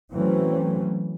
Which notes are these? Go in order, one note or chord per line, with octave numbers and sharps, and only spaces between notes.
E3 F#3 A3 C4 C#4